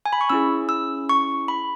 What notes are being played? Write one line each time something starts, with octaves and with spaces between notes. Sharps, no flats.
G#5
B5
C#6
C#4 E4 G#4 E6
E6
C#6
B5